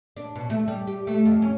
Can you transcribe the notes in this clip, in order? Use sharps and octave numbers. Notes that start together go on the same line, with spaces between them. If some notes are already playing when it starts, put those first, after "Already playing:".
D4
B2
A3
G3
G4
A3
F2
C#4